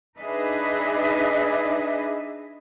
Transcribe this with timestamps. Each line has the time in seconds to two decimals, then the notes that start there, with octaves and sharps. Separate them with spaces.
0.18 D4 D#4 G#4 B4 D#5 E5